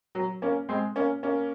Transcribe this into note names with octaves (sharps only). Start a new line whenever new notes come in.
F#3
A#3 C#4
G#3 C4
A#3 C#4
A#3 C#4